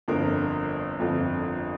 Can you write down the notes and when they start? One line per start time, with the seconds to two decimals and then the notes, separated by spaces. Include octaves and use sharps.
0.08 G1 F2 D3 F3 A#4
0.99 G1 F2 D3 F3